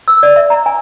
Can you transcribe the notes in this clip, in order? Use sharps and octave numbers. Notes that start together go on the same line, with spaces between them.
E6
D5
E5
A#5
G#5